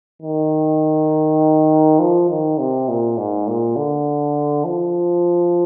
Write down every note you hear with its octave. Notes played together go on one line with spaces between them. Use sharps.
D#3
F3
D#3
C3
A#2
G#2
A#2
D3
F3